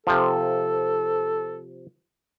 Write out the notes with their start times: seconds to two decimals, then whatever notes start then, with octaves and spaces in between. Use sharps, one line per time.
0.07 C3 F3 A4